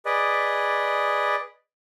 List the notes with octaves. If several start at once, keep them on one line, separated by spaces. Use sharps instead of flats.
G#4 B4 D5 D#5